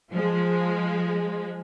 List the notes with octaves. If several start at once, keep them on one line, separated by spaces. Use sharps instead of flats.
F3 G#3